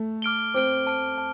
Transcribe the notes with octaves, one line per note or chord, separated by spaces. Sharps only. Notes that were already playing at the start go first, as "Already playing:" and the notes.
Already playing: A3
D6 F6 D7 G7
C4 D6 F6 D7 G7
A5 F6 D7
A5